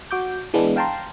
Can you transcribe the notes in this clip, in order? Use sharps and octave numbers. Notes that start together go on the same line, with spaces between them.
F#4 D6 G6
E3 G#3 B3 D4
F5 G5 A5 A#5 C6